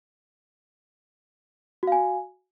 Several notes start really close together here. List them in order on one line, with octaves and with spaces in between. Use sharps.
F#4 F5 G#5